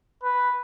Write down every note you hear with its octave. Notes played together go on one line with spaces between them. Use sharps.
B4